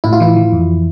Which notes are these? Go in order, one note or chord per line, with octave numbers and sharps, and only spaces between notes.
A2 E4
F4
E3 E4
E3
F2